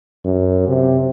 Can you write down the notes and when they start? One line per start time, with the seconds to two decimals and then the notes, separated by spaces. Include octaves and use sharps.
0.25 F#2
0.68 C3